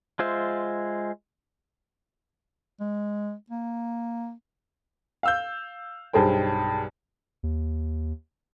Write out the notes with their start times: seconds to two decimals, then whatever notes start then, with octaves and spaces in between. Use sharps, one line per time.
0.19 G#3 F4 C5 E5
2.80 G#3
3.50 A#3
5.23 F5 E6 G6
6.13 B1 G2 G#4 C5 G5
7.43 D#2